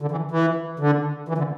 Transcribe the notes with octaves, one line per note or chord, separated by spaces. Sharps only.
D3
E3
E3
D3
E3
D3